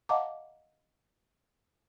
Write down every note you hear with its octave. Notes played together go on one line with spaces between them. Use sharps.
D#5 F5 F#5 A5 A#5 D6